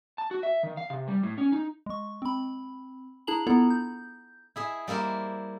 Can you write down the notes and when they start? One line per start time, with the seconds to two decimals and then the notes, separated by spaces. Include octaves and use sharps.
0.18 A5
0.31 F#4
0.43 E5
0.63 D#3
0.77 F5
0.90 C3
1.08 G3
1.23 A2
1.38 C#4
1.52 D#4
1.86 G#3 C#6
2.22 C4 B5
3.27 D4 E4 G#4 A5 A#5 F#7
3.47 B3 D4 E4 F4 A4 A#5
3.70 G6
4.56 E4 G#4 E5
4.88 G3 A#3 E4 A#4 C5